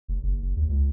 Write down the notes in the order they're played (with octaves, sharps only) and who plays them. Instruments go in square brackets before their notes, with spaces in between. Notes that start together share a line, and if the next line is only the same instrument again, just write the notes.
[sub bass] F1
F#1
F#1
D#2
C#2